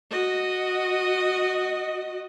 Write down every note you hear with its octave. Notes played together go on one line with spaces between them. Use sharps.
F#4 D#5